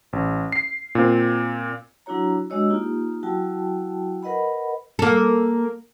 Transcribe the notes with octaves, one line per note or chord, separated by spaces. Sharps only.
A1
C7
A#2 C4
F#3 D4 E4 F#4 C#5 A#5
G#3 D4 F#4 C#5 D#5 E6
A#3 D#4 F4 G4
F#3 E4 F#4 G5 A5
A#4 B4 D#5 F#5 B5
A#3 A4